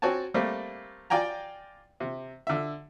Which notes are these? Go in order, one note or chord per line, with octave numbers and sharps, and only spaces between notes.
C4 F#4 C#5 G#5 A5
G3 A3 A#3 C4
F4 D5 G5 G#5 A#5
C3
D3 E5